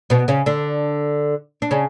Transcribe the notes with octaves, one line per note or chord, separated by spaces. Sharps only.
B2 B3
C#3 C#4
D3 D4
D4
C#3 C#4